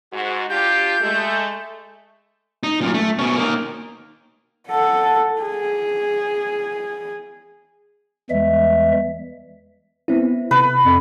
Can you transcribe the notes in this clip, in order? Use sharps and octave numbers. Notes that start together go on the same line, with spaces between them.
G#2 F#4
D4 F4 G4 G6
G#3 A3
D#4
F#2 A#2
A3
B2 C#4
A#3 D#4
A4 F#5
G#4
E2 E3 G3 G#3 E5
B3 C4 E4
C3 B4
F2